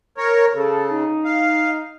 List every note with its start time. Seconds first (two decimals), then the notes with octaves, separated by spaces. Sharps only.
0.18 A#4 C#5
0.54 C#3 A4
0.90 D#4
1.25 F5